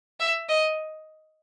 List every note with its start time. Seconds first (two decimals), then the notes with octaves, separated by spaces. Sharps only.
0.20 E5
0.49 D#5